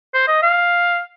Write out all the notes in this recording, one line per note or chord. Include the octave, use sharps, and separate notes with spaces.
C5
D#5
F5